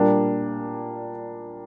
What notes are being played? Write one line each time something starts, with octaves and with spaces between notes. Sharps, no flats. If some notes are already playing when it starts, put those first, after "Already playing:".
Already playing: A#2 G3 A#3 D4